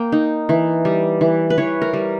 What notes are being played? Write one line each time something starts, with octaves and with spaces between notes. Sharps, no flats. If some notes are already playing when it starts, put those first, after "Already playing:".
Already playing: A#3 G5
D#4
E3
G3
E3
B4
E3 C#5
A#4
G3